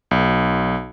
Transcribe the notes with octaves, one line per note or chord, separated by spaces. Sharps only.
B1